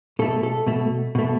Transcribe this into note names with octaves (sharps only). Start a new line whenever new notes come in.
B2 A3 A4
A4
B2 A3
B2 A3